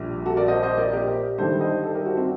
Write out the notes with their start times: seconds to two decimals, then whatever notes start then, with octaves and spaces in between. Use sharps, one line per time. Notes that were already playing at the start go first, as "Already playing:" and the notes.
Already playing: A#1 A#2 G3
0.25 F#4 A4
0.37 A#4 D5
0.48 C5 D#5
0.63 C5 D#5
0.78 A#4 D5
0.93 G4 A#4
1.38 G1 G2 D#3 G3 A4 C5
1.61 C5 D#5
1.84 A4 C5
1.95 G4 A#4
2.06 F#4 A4
2.17 C4